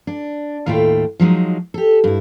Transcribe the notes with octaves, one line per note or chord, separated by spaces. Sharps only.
D4
D#2 A2 A3 F4 G5
F3 F#3 G#3 D#4
G4 A4
G2 E4